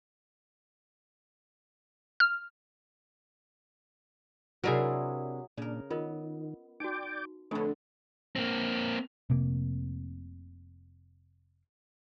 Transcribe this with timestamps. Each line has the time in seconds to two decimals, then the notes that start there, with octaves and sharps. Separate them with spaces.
2.20 F6
4.64 C3 F#3 D4 E4 G#4 A#4
5.58 A#2 C#3 D4 A#4
5.90 D#3 B3 F4 A#4 D#5
6.80 D#4 F#4 D5 G5 D6
7.51 F2 D3 A3 D4 A4 B4 C#5
8.36 A#3 C4
9.30 F1 C3 A#3